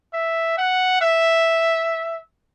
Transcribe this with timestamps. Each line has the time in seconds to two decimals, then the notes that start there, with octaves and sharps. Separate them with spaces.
0.13 E5
0.58 F#5
1.01 E5